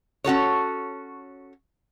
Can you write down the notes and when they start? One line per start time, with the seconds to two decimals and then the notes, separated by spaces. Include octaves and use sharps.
0.24 C#4 F#4 A4 C#5